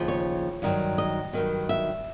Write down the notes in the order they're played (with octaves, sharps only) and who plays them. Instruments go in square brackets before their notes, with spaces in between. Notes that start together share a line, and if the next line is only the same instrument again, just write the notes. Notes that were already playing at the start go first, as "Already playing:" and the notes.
Already playing: [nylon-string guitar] D#2 C#3 F3
C#5
G2 D#3 F#3
D#5
G2 D#3 F#3
E5